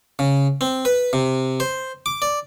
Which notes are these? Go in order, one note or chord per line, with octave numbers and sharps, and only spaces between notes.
C#3
C4
B4
C3
C5
D6
D5